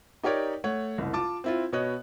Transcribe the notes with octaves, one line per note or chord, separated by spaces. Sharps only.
D#4 G4 A#4 C#5 D5
A3 C#5 F#5
F#1 C2
F4 A5 D6
C4 E4 F4
B2 B3 C#5 D#5 F#6